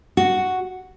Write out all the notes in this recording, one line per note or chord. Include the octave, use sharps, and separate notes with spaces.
F#4